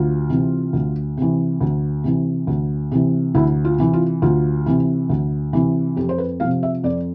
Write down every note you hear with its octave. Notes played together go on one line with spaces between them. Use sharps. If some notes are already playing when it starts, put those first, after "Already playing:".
Already playing: D2 F4
C3 E3
D2
C3 E3
D2
C3 E3
D2
C3 E3
D2 E4
F4
C3 E3
F4
D2 F4
C3 E3
D2
C3 E3
F2 G4
C5
B4
C3 F3 F5
E5
F2 D5